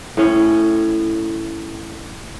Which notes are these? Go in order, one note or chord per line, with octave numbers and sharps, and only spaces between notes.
A2 C#4